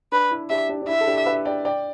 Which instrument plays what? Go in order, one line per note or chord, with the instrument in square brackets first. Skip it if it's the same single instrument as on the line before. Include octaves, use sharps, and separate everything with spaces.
[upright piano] D4 [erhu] B4
[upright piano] E4
[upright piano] D4 G4 [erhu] E5
[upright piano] D4 G4
D4
[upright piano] E4 [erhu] E5
[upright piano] A4
D4 G4
B4 E5
D5 G5
D5 G5